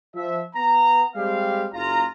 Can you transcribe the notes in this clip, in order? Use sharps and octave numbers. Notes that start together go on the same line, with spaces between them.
F3 E5
B3 A#5
G3 G#3 C4 G4 F5
F#1 F4 A#5